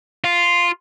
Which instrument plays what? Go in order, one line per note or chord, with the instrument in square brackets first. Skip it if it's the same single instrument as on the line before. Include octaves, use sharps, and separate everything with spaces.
[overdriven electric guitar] F4